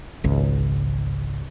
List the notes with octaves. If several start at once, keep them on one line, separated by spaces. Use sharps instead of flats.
G#1 C#2